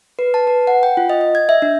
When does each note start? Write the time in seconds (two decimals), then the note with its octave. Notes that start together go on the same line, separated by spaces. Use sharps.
0.19 B4
0.34 A5
0.47 B4
0.67 F#5
0.83 G5
0.97 F4
1.10 D#5
1.21 D#5
1.35 G#6
1.49 E5
1.62 D4